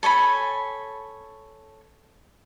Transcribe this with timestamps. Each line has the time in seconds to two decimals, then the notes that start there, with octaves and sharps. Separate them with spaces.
0.03 A4 C#5 G#5 B5